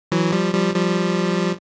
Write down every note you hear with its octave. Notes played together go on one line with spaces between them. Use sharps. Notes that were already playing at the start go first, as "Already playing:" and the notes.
E3 F#3
F3 G3
F3 G3
F3 G3